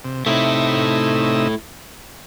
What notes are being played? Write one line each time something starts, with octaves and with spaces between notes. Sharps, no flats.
C3
C3 A3 D#4 E4 E5